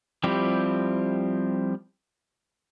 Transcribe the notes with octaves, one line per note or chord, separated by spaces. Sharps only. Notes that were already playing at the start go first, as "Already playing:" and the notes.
F3 G3 C4 E4 G4